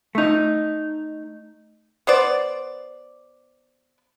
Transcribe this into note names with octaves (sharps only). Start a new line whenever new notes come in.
A3 D#4
B3 C5 D5